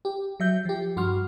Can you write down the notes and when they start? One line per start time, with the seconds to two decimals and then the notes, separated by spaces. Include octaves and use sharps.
0.05 G4
0.40 F#3 E5 G6
0.65 F3 G4
0.97 G2 F#4 C6 F6